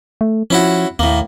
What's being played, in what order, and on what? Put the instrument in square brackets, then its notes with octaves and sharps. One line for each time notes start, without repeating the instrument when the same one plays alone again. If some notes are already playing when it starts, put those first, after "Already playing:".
[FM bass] A3
[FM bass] F3 [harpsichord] C#4 E4 F#4
[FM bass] D#2 [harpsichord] A2 A#3